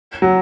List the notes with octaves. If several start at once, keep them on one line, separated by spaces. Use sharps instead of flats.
F#3